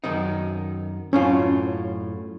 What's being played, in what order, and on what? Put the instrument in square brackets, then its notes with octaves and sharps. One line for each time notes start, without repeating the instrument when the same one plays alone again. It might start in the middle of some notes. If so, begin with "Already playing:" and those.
[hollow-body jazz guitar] F#2 D#3 D#4
[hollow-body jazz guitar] F#2 A2 F4 [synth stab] C#4